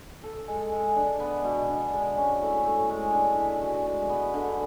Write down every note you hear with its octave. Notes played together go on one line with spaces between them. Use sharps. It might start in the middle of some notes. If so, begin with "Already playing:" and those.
A4
G#3
G#3
D4
B3
B2
D4
G#3
C#4
A2
A2
G#3
D4
E3
F#4
G#3
B3
D3